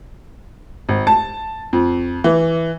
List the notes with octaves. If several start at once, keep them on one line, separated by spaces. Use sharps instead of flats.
G#1
A5
F2
E3